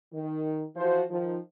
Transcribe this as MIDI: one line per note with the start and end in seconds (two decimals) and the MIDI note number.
0.13 0.65 51
0.76 1.03 52
0.76 1.03 53
0.76 1.03 66
0.76 1.03 72
1.10 1.38 51
1.10 1.38 53